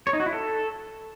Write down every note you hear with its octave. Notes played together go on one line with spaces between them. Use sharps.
C#5
D#4
F#4
E4
A4